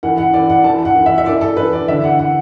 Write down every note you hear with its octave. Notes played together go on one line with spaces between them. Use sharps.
E3 F#5
F#5
E3 D5
F#5
E3 A5
F#5
E3
E5
E5
E3 D5
A4
E3 B4
D5
D3 E5
F#5
F#5